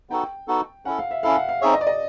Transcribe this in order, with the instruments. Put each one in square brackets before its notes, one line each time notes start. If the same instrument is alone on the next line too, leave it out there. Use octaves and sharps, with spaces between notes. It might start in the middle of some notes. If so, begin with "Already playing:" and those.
[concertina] B3 D#4 F#4 A4 [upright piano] G5
[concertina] B3 D#4 F#4 A4
[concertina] C#4 E4 A4 [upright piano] F#5
[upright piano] F5
E5
[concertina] C#4 E4 A4 [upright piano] F5
[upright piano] F#5
F5
[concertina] C4 D#4 G#4 C#5 E5
[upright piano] D#5
D5
D#5